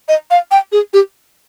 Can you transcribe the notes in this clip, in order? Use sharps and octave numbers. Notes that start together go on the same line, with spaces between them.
D#5
F5
G5
G#4
G4